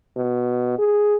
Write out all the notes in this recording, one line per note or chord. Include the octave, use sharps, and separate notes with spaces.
B2
G#4